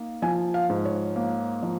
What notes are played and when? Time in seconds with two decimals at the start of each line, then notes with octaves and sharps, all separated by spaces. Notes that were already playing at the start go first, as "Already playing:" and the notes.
Already playing: A#3 D#4
0.22 F3 G#5
0.54 F5
0.69 G#2
0.85 C#5
1.16 A#3
1.63 F3